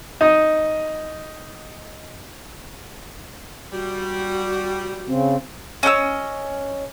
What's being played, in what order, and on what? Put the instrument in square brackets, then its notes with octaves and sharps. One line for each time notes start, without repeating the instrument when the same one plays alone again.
[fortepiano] D#4 D#5
[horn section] G3 [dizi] F#4
[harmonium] C#3 [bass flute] C4
[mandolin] C#4 D#5 F#5 E6